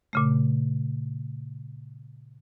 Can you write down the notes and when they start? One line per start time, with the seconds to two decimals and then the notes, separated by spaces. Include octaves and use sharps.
0.13 A#2 C#3 A3